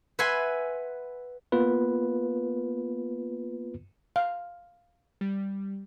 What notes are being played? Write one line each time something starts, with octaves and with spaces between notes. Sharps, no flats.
B4 E5 F#5 G#5 C6
A#3 B3 F4 B4
F5
G3